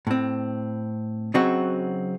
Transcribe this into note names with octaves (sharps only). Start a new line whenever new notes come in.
A2 C4
C#3 F#3 C4 D#4 F#4